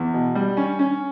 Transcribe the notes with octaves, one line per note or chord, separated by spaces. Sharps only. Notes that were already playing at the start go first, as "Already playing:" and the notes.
Already playing: E2
B2
G3
C#4
C#4